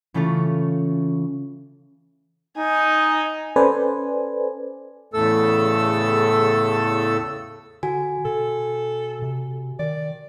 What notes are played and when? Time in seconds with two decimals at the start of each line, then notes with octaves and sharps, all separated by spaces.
0.14 C#3 E3 A3 C#4 F4
2.58 D#4 G#5
3.56 C#4 A4 B4 C5 D5 G#5
5.14 E2 A2 C#3 A3 A4 E6
7.83 D3 F#4 G#5
8.25 B2 A4
9.22 C3
9.79 D#3 D5